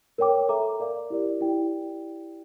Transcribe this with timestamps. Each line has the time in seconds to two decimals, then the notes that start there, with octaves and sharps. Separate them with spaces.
0.18 A#4 C#5 G5 D6
0.49 A4 E5 A#5 D6
0.80 A#4 D5 F5
1.10 E4 G4 A#4 D5
1.41 E4 G4 D5 G5